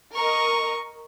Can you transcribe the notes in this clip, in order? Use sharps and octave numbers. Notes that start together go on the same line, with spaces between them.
A#4 D#5 C#6